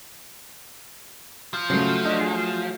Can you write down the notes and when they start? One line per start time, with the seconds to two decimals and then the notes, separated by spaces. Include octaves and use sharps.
1.54 F3
1.70 C#3 F#3 A3 C7
2.05 D4 F#4 D#5
2.21 G#4